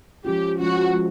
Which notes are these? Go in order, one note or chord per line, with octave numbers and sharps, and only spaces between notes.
F3 G#3 C#4 F4 G4
F3 G#3 C#4 F4 F#4
F3 G#3 C#4 F4